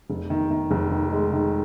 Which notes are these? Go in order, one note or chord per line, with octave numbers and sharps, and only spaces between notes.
F1
D#3
D#3
F1
D#3
G#3
D#3